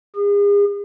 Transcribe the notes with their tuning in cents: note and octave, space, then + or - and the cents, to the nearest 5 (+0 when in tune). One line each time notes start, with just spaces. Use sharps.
G#4 -40